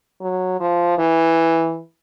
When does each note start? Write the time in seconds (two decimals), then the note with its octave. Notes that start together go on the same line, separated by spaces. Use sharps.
0.21 F#3
0.60 F3
0.99 E3